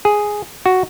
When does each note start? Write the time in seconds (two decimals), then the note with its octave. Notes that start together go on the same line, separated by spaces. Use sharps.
0.05 G#4
0.66 F#4